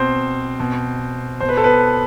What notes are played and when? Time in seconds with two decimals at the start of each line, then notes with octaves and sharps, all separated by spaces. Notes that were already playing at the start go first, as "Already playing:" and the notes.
Already playing: B2 C4 C5
0.60 B2
1.41 B2 C5
1.49 B4
1.57 A4
1.64 B3 B4